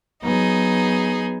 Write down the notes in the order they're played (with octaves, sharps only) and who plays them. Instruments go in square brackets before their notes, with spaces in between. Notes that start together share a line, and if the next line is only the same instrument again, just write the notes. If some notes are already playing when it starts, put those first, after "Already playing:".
[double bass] F#3 B3 [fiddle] D#4 G#4